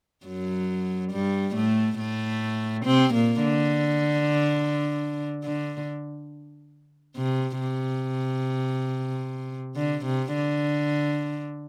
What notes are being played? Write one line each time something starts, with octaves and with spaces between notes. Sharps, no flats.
F#2 F#3
G2 G3
A2 A3
A2 A3
C3 C4
A#2 A#3
D3
D3
C3
C3
D3
C3
D3